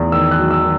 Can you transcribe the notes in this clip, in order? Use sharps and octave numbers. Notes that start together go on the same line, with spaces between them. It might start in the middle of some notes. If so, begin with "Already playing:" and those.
Already playing: E2
D#3 E6
F#6
F#3
E6
D#3